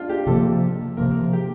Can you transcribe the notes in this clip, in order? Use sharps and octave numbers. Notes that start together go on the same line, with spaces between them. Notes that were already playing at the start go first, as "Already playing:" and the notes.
Already playing: D4 F4
G4
C3 F3 A#3 A4
C3 F3 A#3 A#4
G4